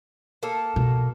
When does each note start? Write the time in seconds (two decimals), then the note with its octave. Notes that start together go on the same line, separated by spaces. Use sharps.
0.43 A#3 A4
0.76 B2